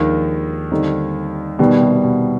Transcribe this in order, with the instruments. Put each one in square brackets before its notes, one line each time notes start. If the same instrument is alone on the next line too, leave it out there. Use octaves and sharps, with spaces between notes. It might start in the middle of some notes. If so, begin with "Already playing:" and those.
Already playing: [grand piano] D#2 D#3 [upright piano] F3 G#3 D4
[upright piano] D3 G3 C4 D#4
[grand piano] B2 [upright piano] D#3 G3 B3
[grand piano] C3
B2